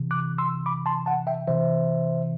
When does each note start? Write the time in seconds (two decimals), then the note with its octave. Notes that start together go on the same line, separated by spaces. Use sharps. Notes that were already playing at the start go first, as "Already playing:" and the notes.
Already playing: C3 E3
0.11 D6 F#6
0.38 C6 E6
0.66 B5 D6
0.86 A5 C6
1.06 F#5 A5
1.27 E5 G5
1.47 C3 E3 C5 E5